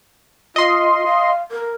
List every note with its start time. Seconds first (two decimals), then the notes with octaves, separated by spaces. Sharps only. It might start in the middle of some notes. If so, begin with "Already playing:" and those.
0.56 F4 D#5 C6
1.06 F5
1.51 A#4